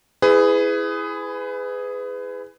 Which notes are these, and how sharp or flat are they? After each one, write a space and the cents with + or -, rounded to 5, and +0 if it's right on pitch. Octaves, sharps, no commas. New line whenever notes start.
E4 +0 G#4 +0 B4 +30